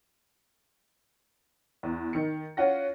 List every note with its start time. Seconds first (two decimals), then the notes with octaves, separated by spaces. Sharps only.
1.83 E2
2.13 D#3 C#7
2.57 C#4 F4 F#5 A#6